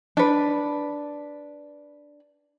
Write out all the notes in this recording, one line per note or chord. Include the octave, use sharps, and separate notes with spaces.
D4 B4